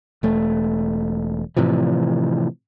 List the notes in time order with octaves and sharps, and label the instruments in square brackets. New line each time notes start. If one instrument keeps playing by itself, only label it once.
[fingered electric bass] E1 A3
A2 C3 E3 F3